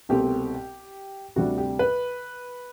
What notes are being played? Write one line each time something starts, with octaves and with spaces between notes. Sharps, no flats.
C2 B2 A3 C4 G4
D2 C3 G3 D4 F#4
G4
B4